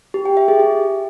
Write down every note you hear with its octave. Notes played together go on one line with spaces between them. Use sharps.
G4
G5
E5
G#4
G4